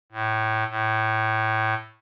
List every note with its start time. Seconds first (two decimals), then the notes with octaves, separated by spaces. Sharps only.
0.12 A2
0.70 A2